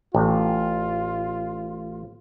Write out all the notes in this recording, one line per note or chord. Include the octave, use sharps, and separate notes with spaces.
A1 F4